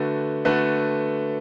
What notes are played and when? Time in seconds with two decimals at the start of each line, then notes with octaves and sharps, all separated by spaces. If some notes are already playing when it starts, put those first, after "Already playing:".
Already playing: D3 A3 F#4 B4
0.45 D3 A3 F#4 B4